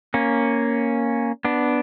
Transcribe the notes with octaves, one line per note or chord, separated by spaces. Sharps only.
A#3 C#4
B3 D4